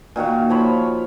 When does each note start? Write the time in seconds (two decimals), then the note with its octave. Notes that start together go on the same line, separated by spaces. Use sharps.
0.16 A#2 D#3 F#4 F5
0.50 F3 C#5 B5